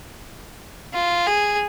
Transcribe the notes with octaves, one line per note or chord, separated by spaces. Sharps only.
F4
G#4